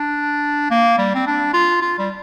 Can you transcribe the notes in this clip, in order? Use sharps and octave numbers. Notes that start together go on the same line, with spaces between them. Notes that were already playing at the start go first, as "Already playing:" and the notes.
Already playing: D4
A#3
G3
C4
D4
F4
F4
G3